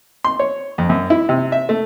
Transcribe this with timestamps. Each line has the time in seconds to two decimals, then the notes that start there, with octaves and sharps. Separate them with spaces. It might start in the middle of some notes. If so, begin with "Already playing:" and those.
0.25 C6
0.39 C#5
0.78 F2
0.89 F#2
1.10 E4
1.29 C3
1.52 E5
1.69 A3